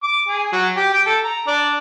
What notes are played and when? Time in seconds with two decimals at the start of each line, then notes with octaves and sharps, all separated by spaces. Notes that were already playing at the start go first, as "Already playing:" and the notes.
0.03 D6
0.28 G#4
0.52 F#3
0.76 G4
0.93 G5
1.06 A4
1.24 A#5
1.47 D4